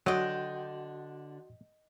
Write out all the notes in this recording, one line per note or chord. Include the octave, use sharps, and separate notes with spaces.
D3 F#3 D4 F#4 D#5 F#5 G5 C6